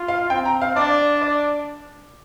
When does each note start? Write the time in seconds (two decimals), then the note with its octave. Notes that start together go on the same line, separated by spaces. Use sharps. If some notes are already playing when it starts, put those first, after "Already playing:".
Already playing: F4
0.08 F5
0.30 C4 G5
0.45 A#5
0.62 F5
0.76 D4 D5
1.21 D5